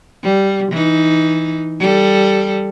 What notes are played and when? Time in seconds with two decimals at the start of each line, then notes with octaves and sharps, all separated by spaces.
0.23 G3
0.72 E3 D#4
1.80 G3 A4